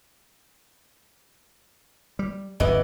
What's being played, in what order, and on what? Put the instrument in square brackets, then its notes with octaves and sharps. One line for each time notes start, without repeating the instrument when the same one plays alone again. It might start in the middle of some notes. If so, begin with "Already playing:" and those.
[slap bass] G3
[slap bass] D1 G1 F#2 [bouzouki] E3 B3 D#5